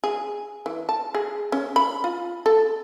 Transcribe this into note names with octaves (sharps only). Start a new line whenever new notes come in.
G#4
E3
A5
G#4
C#4
B5
F4
A4